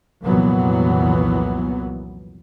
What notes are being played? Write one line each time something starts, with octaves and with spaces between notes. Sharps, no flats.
C2 F2 A#2 E3 F#3 B3